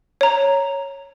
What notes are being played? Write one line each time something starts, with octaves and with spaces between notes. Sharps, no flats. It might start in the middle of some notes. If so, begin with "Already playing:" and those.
C#5 A#5